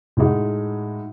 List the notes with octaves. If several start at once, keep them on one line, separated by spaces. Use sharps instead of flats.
A2 G#3 D#4 F#4